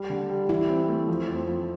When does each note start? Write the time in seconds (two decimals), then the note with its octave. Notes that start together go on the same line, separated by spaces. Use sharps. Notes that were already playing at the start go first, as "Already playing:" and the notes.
Already playing: G3
0.10 D3
0.30 G3
0.49 E3 E4
0.69 C4
0.88 A3
1.08 F3
1.28 F2
1.48 F3